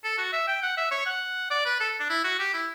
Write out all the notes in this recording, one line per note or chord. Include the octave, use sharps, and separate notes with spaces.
A4
F#4
E5
G5
F#5
E5
C#5
F#5
D5
B4
A4
D4
E4
F#4
G4
E4